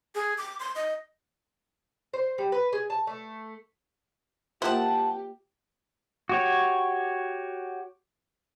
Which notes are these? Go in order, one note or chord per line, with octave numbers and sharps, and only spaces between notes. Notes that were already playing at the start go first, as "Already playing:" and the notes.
G#4
D6
C6
D#5
C5
G3
B4
G#4
A5
A3
A#3 F4 G4 C5 E5 F#5 A5
F#4 G4 C#5